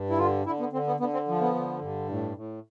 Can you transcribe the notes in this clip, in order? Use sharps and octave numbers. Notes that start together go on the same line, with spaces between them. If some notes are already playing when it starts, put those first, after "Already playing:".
Already playing: G2
E4
D3 F4
D3 E4
B3
D3 C4
B3
D3 B3
C4
F3
B3
D3
G2
A2
A2